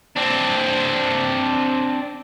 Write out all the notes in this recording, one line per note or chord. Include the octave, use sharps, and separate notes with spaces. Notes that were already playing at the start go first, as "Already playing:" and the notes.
C4 D4